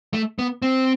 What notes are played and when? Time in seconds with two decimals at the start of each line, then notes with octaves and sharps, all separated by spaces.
0.13 A3
0.39 B3
0.62 C4